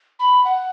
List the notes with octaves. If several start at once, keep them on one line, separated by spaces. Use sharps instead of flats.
B5
F#5